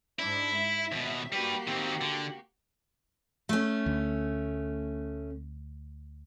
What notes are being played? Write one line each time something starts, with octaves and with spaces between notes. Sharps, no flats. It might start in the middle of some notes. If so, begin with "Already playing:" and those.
G#2 D4 E4
E5
D#2 B2
G3 A#3 F#4 G4 B4
D#3 C4
D3
A3 C#4
D2